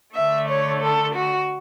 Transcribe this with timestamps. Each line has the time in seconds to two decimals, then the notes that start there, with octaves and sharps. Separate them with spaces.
0.15 D3 A3 E5
0.48 C#5
0.82 A4
1.14 F#4